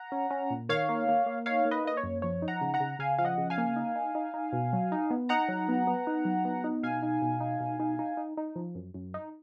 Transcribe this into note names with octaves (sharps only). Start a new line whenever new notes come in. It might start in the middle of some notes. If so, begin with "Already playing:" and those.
Already playing: F#5 A#5
C#4
C#4
A#2
D#3 C#5 F5
A#3
A#3
A#3
D#4 C#5 F5
A#3
B4 D#5
A#3 D#5
C#5
F#2
F3 C#5
D#4
F#5 A#5
C#3
F#5 A#5
C#3
C#3 F5 G#5
F3 F5
D#5 F#5
C#3
F5 G#5
A#3
D#4
D#4
D#4
D#4
B2
F#3
D#4
B3
D#4 F#5 A#5
F#3
B3
B3
D#4
F#3
B3
D#4
B2 F5 G#5
D#4
B2
D#4
B2
D#4
D#4
D#4
D#4
F3
F#2
F#2
D#4